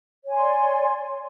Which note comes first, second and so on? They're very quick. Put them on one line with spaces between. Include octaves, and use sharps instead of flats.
C#5 G#5 C6 D5